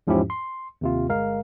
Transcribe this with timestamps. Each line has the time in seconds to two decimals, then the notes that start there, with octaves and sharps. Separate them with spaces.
0.07 E2 G#2 F3 C#4 E4 G4
0.30 C6
0.81 D#2 C3 F4
1.09 G1 G#3 A#4 F5